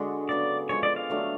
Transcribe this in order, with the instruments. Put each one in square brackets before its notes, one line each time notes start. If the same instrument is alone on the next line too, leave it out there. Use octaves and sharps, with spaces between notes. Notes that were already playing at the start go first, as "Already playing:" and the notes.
Already playing: [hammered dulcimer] D3 G#3 D4 F#4 G#4
[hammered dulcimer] C#3 F#3 B3 [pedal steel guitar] D5
[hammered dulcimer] F3 G#3 D4 [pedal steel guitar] C#5
[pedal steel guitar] D5
F5
[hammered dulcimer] D3 F#3 A3 D4